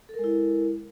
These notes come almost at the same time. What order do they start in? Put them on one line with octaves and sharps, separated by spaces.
A4 A#4 G#3 E4